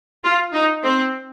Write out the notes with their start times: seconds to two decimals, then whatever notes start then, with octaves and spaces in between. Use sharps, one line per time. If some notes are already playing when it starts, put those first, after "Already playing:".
0.24 F4
0.54 D#4
0.83 C4